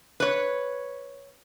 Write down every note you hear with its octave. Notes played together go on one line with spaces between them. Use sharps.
B4 C#5